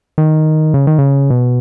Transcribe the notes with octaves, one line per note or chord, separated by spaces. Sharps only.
D#3
C#3
D#3
C#3
B2